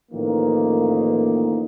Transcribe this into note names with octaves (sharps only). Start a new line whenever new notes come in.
A1 D#3 F3 A#3